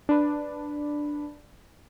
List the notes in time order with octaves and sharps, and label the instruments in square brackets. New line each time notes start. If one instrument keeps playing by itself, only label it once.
[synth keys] D4 B4